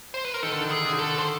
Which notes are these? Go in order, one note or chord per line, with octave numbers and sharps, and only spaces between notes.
C5
B4
A#4
D#3 A4
D3
D#3
G#4
D3
D#3
D3 A4
C5